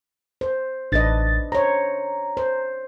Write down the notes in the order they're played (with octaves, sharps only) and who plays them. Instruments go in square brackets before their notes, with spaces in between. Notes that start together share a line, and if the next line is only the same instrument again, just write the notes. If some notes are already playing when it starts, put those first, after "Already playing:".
[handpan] C5
[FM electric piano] A1 A6 [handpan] D4 B4 D#5
[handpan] C5 C#5 [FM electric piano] A#5
[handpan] C5